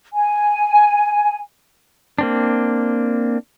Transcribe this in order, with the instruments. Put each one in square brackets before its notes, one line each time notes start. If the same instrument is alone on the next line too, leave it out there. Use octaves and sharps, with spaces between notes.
[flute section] G#5
[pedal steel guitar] A#3 C4 D4